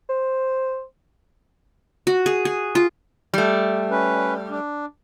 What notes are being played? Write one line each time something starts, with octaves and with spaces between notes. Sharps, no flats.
C5
F#4
G#4
G#4
F4
G3 A3
C#4 B4
D4